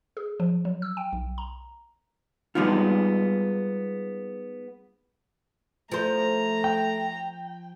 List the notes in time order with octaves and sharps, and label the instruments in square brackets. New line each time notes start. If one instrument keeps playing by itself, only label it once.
[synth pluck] G#4
F3
F#3
E6
G5
B1
A#5
[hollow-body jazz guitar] G3 G#3 B3 D#4 F4
[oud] F3 C5 [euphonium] A3 [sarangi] A#5
[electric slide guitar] G5